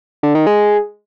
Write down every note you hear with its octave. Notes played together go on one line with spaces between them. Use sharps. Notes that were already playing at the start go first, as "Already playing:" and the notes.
D3
D#3
G#3